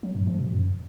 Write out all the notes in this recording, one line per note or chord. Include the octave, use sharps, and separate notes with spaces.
F#3
G2
F3
B2
F#2